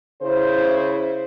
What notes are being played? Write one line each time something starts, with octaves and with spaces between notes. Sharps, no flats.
C#3 E4 C5